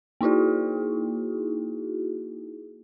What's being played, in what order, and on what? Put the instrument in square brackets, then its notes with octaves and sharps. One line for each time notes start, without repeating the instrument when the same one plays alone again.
[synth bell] A#3 D#4 E4 F#4 G#4